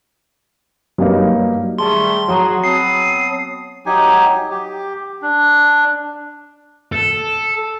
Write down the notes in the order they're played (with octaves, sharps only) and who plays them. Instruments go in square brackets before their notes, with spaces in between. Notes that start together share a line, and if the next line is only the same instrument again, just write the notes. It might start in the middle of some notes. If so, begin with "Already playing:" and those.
[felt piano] G2 A#3 D#4 [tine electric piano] F#3
[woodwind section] D#3 G3 A3 [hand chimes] G#4 A5 [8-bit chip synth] C6
[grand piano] F#3 [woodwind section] F#4 G#4 [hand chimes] C#5 A#5 D#6
[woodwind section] B3 C4 D#6 [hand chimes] C#5 A5 [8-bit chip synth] C7
[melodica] F#3 D#4 G4 G#5
G4
D4
[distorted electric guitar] A4